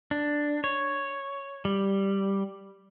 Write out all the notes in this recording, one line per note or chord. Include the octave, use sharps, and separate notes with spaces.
D4
C#5
G3